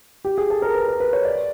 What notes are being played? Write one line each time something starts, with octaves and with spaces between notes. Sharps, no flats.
G4
G#4
A4
A#4
B4
A#4
B4
C#5
D5